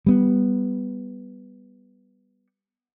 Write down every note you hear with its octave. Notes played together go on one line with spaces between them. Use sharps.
G3 B3